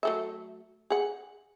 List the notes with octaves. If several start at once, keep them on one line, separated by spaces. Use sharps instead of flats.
F#3 A3 E5
G#4 F#5